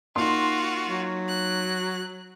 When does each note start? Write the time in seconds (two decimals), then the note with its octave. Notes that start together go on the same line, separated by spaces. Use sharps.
0.16 A#3 D#4 F4 F#4 C6
0.88 F#3
1.29 F#6